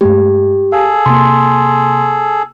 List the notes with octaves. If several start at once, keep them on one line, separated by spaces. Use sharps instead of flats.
G2 G#3 A3 G4
G#4 A4 F5
C3 A#3 C6